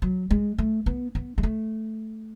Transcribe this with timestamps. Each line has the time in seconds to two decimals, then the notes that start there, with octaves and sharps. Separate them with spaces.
0.02 F#3
0.31 G#3
0.58 A3
0.86 B3
1.15 B3
1.38 G#3
1.43 A3